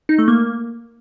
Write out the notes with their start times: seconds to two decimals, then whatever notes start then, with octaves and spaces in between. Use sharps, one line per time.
0.09 D#4
0.18 A3
0.28 A#3